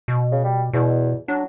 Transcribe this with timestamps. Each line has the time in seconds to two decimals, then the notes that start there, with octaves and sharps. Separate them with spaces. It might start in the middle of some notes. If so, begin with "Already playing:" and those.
0.08 B2
0.32 C#3
0.44 G3
0.73 E2 B2
1.28 F#3 D4